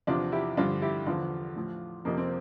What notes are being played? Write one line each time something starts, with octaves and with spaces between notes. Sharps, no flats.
E2 C3 F3 D4 F4
E4 G4
G2 D3 F3 D4 F4
E4 G4
E2 D3 F3 D4 F4
A2 F3
F2 C3 F3 A#3
C4